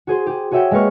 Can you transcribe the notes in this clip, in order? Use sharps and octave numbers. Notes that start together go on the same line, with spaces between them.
F#4 G#4 C5
G4 G#4
F#4 G#4 C#5 E5 F#5 G5
G#3 A#3 B4 C#6 F6